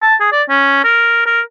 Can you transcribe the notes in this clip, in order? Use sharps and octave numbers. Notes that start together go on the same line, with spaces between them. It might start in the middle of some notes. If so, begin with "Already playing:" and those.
A5
G#4
D5
C#4
A#4
A#4